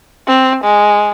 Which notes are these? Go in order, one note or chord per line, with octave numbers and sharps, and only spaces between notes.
C4
G#3